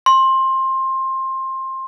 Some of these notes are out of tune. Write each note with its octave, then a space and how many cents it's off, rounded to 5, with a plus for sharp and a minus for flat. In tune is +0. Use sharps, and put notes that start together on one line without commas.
C6 +20